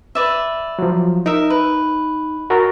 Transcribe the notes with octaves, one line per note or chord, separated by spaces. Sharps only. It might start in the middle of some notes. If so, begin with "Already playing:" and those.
B4 D5 E5
F3 F#3
D#4 A#4 E5
B4
F#4 A#4 A#5